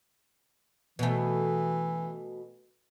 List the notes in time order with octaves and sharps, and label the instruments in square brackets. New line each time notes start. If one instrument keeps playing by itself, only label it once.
[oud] B2 A3 [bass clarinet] E3